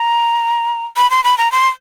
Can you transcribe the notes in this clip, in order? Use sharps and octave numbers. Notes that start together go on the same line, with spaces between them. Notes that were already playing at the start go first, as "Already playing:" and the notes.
Already playing: A#5
B5
C6
B5
A#5
C6